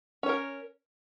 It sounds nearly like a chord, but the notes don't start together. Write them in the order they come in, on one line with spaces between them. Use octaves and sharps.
C#4 C#5 A#4